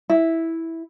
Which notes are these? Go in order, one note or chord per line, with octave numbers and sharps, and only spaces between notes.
E4